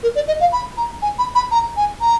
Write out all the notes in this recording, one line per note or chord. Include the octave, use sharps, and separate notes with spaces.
A#4
D5
D#5
F5
B5
A#5
G#5
B5
B5
A#5
G#5
A#5